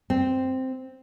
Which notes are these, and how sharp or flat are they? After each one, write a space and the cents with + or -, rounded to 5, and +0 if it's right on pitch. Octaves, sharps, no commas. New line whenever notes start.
C4 -5